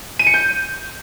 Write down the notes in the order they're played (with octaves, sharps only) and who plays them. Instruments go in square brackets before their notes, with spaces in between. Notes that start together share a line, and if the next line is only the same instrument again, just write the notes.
[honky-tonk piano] D#7
C#7
G6